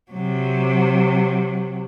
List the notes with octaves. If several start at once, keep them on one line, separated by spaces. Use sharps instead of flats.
C3 F#3